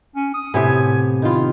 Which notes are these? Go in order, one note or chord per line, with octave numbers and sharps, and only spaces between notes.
C#4
D#6
A2 C3 B3 G#5
D#3 E4 F4